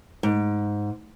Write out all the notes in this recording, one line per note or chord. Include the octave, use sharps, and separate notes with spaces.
G#2